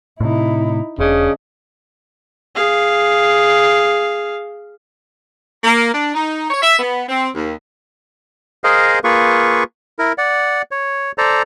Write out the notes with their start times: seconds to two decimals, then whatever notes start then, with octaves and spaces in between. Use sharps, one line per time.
0.20 A2 C3 D#4 E4
0.99 E1 C#3 D4 D#5
2.55 G#4 F5
5.64 A#3
5.94 D4
6.15 D#4
6.51 C#5
6.63 E5
6.79 B3
7.08 C4
7.35 D#2
8.64 G#4 A#4 C5 D#5 F5
9.04 A#3 F4 G#4 B4 C#6
9.99 E4 A#4
10.18 D5 F#5
10.71 C#5
11.18 A4 C5 D5 A#5